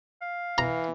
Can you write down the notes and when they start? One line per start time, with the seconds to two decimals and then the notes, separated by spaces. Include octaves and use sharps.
0.22 F5
0.58 E3 A#5